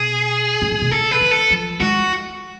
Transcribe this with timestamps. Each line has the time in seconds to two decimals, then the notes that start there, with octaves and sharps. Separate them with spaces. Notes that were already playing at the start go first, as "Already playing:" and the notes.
Already playing: B2 G#4
0.62 G#2
0.71 A2
0.82 B2
0.91 C#3 A4
1.11 B4
1.21 D3
1.31 A4
1.51 F3
1.81 G#3 F#4